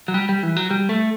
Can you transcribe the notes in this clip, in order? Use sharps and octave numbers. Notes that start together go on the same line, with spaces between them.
F#3
G3
G3
E3
F#3
G3
A3